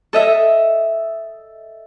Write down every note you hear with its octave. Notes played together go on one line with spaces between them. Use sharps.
A4 D#5 E5